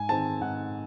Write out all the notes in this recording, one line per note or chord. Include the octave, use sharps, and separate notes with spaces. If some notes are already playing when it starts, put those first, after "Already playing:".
Already playing: G#2 G#5
D#3 G#3 C4 A5
G#2 F#5